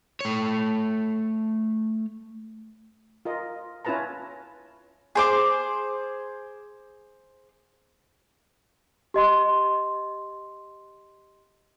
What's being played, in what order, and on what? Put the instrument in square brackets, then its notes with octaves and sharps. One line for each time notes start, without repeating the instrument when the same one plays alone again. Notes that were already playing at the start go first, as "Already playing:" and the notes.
[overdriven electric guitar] A3 C#5
[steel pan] F4 A#4 D#5
C#4 E4 F4 B4 A5 A#5
[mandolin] G#4 C5 D6
[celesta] G4 D#5 C6